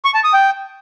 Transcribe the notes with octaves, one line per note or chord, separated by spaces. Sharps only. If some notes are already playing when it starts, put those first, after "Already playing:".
C#6
A5
D#6
G5